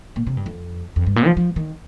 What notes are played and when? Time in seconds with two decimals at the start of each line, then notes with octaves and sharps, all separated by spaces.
0.16 A#2
0.27 C3
0.37 G2
0.46 F2
0.96 F2
1.06 G2
1.16 A#2
1.26 F3
1.37 F3
1.56 D#3